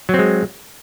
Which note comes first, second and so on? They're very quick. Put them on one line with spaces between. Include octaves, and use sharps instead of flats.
F#3 C4 G#3